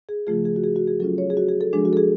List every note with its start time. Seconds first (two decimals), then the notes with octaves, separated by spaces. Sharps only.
0.09 G#4
0.27 C#3 F3 A3 F4 G#4
0.45 G#4
0.56 F#4
0.64 G#4
0.76 F#4
0.88 G#4
1.00 F#3 C#4 F4 A4
1.18 C#5
1.30 G#4
1.37 F#4
1.48 G#4
1.61 A4
1.73 F3 G#3 D4 G#4
1.85 F#4
1.93 A4
1.97 G#4